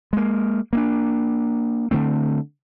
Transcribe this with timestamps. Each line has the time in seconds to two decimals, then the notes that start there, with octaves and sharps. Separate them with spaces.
0.13 G#3 A#3
0.73 A#3 C4 D4
1.91 D3 A3 C4